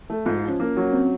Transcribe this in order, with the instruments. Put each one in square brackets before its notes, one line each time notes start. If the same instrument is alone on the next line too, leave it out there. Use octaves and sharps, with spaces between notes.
[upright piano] A3
[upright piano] G#2 [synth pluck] F4
[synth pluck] F4
[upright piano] F3 [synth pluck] C#4
[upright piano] A#3
F#3
[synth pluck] C4